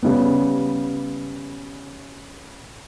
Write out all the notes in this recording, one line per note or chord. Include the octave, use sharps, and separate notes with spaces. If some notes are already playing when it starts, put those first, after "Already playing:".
C#3 G3 B3